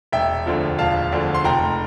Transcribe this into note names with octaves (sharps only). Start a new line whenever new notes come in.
E1 E5 G5
D2 D3 F3
E1 F5 A5
D2 D3 F3
C6
F1 G5 A#5